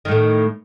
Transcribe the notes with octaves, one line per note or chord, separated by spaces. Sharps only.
A2 D#3 A3